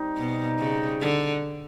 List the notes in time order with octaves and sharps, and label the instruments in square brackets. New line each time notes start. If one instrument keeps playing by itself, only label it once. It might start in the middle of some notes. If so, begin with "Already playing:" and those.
Already playing: [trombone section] G3 C4 D#4
[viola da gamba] B2
C#3
D3